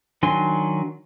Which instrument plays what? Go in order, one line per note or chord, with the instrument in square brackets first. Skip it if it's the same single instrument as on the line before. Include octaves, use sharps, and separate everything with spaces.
[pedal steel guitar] D#3 F#3 D4 G#5 C6